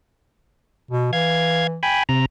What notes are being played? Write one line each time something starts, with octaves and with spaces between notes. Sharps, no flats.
B2
E3 F5 G#6
G5 G#5 B5
C3 A#5